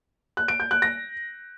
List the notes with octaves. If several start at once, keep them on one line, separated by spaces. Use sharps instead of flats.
F#6
D7
G6
F#6
A#6